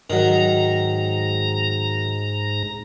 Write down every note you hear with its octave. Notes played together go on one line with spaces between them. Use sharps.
G#2 D#3 F#3 A#5